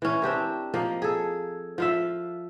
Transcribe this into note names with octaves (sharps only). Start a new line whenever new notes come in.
E3 C#4
C4 D4 G4 A#4
F3 A#3 D#5
G#4 A4
F3 F4 E5